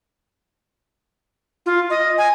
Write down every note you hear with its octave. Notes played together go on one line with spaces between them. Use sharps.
F4
D#5
G#5